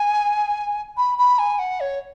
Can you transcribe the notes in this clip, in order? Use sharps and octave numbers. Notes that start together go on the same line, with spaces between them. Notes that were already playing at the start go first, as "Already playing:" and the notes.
Already playing: G#5
B5
B5
G#5
F#5
C#5